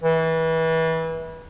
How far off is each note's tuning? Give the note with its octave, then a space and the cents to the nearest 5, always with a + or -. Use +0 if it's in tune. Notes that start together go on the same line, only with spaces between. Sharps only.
E3 -25